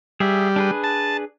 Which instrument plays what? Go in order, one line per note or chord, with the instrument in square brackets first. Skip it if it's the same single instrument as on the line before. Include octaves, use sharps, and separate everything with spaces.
[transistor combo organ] G3 [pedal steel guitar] G#4 E5
[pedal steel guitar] D4 G#4 B4
[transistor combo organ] A5